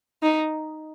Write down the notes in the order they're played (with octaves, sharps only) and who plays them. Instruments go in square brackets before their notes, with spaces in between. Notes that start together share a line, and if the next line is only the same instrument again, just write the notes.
[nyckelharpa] D#4